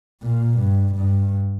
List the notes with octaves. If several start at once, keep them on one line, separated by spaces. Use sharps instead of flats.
A#2
G2
G2